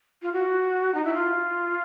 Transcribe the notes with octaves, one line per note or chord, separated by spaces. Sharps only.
F4
F#4
D#4
E4
F4